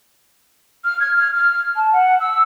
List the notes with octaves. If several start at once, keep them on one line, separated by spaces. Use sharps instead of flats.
F6
G#6
F6
F6
A5
F#5
E6